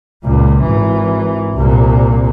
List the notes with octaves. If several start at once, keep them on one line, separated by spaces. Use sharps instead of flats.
C#2 A#2
G#1 E3
C2 A#2